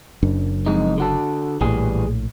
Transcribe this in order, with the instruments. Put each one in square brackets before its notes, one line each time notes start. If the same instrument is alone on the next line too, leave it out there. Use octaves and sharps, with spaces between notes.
[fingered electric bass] F#1 F#2 D4
[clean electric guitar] F2 G#3 D#4
D3 F#4 A4
[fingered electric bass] A#1 A2 [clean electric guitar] E3 G3 G#4